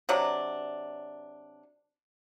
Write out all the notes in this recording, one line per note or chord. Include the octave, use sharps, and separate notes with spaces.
C3 F#3 D4